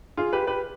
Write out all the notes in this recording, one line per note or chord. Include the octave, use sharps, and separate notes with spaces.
F4 G#4
G4 B4
G4 B4